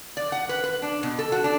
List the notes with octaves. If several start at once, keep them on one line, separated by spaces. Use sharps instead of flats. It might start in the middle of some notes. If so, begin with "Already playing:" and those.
D5
F#5
B4
B4
D4
B2
A4
F#4
D4